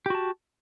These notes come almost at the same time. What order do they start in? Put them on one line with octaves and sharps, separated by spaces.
G4 F#4 A5